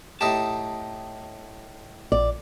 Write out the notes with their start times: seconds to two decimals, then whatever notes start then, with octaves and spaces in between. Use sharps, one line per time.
0.21 A2 D#4 G4 A5
2.12 A#1 D5